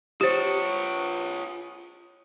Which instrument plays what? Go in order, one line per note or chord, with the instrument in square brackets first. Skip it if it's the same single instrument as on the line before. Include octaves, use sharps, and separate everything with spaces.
[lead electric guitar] F4 C#5 [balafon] G4 C5